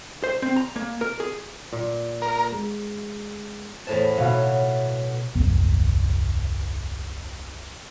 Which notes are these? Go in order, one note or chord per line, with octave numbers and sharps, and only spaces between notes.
C5
C4
A#5
A#3
A#4
G#4
A#2
A#4
G#3
E2 A2 C5 A5
B2 F#3 B3 E5 F5
D#1 C2 F#2 B3